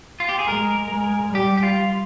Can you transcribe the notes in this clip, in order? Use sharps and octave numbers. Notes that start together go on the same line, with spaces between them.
F4
G4
G#4
G#3 A#4
G#3
G3 G4
G4
F4